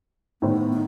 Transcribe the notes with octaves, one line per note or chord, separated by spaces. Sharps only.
A2 D#3 B3 C5
D#4